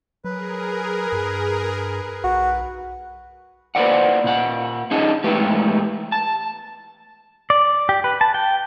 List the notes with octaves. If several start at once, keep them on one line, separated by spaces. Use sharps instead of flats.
F#3 G#4 A#4 B4
G2
B1 F#4
A#3 B4 C5 D5 F#5
A#2 F#5
C#4 D#4 G#4 D#5 A5
E2 A2 G#3 A3 G4 B4
A5
D5
G4
B4
A5
G5